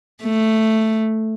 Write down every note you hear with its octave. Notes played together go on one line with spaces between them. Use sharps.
A3